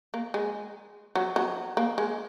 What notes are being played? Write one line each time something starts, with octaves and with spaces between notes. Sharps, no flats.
A#3
G#3
F#3
F#3
A#3
G#3